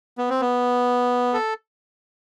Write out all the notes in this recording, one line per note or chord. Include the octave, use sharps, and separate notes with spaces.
B3
C4
B3
A4